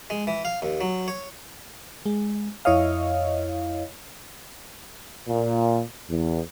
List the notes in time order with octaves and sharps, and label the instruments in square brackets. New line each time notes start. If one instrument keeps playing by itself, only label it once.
[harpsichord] G#3
E3
F5
D#2
F#3
C#5
[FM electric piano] G#3
F2 E4 C#5 D#5 F5
[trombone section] A#2
E2